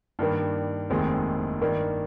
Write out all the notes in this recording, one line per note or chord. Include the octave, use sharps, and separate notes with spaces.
G2 D#3 G3 A#3
F1 D#2 D#3 G#3 C4
G2 D#3 A#3